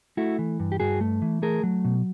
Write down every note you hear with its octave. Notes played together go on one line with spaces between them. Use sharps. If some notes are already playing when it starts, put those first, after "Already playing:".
A3 E4 F#4
E3
G2
G4
G2 F#4 G#4
A3
E3
A3 G#4 A#4
F#3
B2